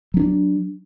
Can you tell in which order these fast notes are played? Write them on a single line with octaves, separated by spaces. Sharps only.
F#3 C#4 D4